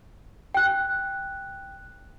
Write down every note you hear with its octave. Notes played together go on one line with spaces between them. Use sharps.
G5 F#6